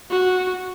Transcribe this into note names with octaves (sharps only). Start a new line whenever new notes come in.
F#4